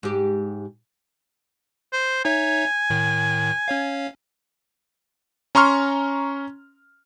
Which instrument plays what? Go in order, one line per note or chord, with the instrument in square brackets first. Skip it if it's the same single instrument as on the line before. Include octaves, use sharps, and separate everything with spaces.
[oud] G#2 G4
[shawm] C5
[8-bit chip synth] D#4 C#5 E5 [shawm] G#5
[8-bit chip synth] A2 D#3
C#4 C#5 F5
[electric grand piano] C#4 A#5 C6 C#6 F6